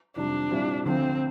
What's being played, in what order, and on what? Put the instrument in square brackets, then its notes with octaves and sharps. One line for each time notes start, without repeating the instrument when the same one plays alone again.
[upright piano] F2 C3 D#3 G3 [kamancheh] D4
[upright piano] A#2 G3 C4 E4
[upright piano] D2 D3 F3 [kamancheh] C4